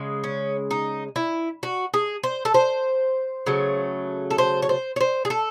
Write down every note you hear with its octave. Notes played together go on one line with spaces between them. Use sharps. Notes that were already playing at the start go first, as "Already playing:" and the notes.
Already playing: C#3 G#3
C#4
D#4
E4
F#4
G#4
C5
A4
C5
C#3 F#3 A3
A4
C5
C#5
C5
C#5
C5
G#4
A4